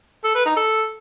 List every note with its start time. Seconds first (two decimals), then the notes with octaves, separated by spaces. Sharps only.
0.24 A4
0.35 B4
0.46 D#4
0.56 A4